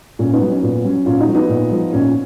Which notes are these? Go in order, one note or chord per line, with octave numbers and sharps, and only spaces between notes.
A#2 C#4
B3 D#4
F#3
C#4
A#2 B3
F#3 C#4
A#2 C#4 F4
D#4 F#4
F3
B3 D#4
A#2
F3
A#2 C#4